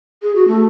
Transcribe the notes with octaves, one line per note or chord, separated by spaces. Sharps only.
G#4
F#4
A3